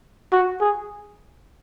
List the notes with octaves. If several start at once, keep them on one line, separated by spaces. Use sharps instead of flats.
F#4
G#4